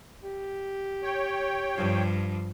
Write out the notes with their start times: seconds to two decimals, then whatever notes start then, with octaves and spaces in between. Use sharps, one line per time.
0.24 G4
1.03 C#5 G5
1.75 G2 F3